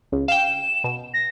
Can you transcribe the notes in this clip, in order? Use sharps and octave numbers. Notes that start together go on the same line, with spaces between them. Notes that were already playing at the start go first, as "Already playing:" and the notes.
C#2
F5 G5 E7
B2
A#6